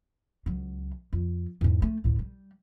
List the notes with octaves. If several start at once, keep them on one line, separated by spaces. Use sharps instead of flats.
C#2 F#3
F2
E2 G#2
A3
D2 A2
G3